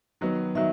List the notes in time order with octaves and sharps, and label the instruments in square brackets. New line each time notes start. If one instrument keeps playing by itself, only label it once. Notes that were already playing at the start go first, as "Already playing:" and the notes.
[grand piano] D#3 F#3 B3
[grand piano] D#3 F#3 [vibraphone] E5